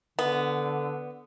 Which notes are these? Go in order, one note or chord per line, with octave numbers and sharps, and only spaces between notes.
D3 B3